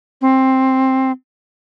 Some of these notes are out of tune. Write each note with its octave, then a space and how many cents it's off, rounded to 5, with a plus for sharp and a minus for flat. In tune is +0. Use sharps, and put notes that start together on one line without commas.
C4 +10